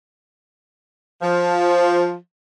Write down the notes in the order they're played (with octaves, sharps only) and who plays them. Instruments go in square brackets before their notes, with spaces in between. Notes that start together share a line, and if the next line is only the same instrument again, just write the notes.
[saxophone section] F3